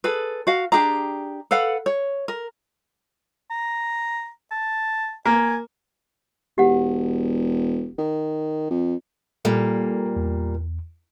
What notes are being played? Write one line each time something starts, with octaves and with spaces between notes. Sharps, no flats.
G#4 A4 B4
F#4 F5
D4 G4 G#4 A#5
A4 B4 F5 F#5
C#5
A#4
A#5
A5
A#3 G#5
E1 G4 F#5
D#3
F2
A#2 G3 A#3 A4
E2